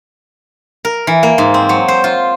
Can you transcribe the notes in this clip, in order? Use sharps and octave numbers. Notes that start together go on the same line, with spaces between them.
A#4
E3
A#3
G#2
C4
F#3
C5
F4